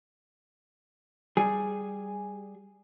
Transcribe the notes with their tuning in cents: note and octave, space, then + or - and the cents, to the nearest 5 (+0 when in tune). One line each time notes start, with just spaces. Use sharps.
G3 +0 G#4 +0